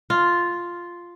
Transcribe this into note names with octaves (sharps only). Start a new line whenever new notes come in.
F4